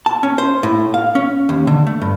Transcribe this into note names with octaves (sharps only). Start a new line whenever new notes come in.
A5
C#4
C5
A2
F5
C#4
D#2
D3
A3
G2